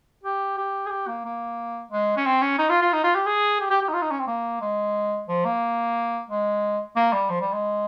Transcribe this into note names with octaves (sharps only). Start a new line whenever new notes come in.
G4
G4
G#4
G4
A#3
A#3
G#3
C#4
C4
C#4
D#4
F4
F4
D#4
F4
G4
G#4
G4
G4
G4
D#4
F4
D#4
C#4
C4
A#3
G#3
F3
A#3
G#3
A#3
G3
F3
G3
G#3